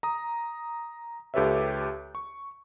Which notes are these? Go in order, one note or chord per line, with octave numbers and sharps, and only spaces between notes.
A#5 D#6
C#2 G4 A4 B4 C#5 E5
C#6